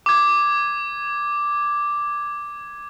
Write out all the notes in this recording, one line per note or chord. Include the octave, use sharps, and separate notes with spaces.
D6 G#6